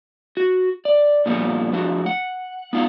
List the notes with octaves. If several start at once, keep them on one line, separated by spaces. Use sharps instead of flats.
F#4
D5
A#2 D3 F3 G3 B3
F3 A3 D4 F#4
F#5
B3 D#4 F4 E5 F#5